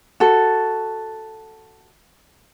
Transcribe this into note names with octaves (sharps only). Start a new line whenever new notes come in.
F#4 A4